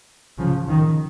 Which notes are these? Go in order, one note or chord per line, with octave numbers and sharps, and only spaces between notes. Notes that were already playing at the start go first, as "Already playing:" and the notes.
C#3 F3
D#3